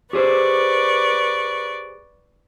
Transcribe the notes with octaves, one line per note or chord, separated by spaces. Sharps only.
G4 G#4 B4 C5 D5 C#6